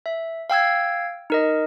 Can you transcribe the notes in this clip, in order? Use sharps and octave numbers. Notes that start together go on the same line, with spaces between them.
E5
F5 G5 E6 G#6
D#4 A#4 D#5